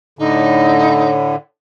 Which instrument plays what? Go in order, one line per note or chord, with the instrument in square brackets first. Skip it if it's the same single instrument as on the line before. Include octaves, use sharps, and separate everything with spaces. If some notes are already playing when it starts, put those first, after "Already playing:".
[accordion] A2 D3 [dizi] D#4